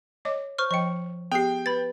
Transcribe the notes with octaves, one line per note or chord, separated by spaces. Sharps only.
C#5 D#5 D6
C5 C#6 F6
F3 D#5 G5 C#6 C#7
B3 G4 G#4 G5 C7
B4 B5 A6